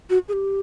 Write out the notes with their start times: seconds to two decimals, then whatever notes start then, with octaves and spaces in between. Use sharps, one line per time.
0.10 F#4
0.29 G#4
0.33 G4